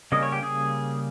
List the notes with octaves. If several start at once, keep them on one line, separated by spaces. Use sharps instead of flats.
C#3 G3 A#3 C#4 D#5
C#5
G4
G#4